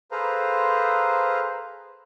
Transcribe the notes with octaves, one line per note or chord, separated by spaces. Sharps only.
G#4 A4 B4 C5 F5 A#5